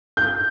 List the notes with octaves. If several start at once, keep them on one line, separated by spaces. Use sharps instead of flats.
G6